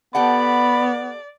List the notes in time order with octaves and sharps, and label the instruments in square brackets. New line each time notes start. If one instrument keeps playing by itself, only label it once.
[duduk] B3 [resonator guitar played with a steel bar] G4 A4 F#5 [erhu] D5 [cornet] B5